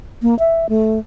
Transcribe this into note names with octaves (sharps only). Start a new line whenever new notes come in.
A#3
E5
A3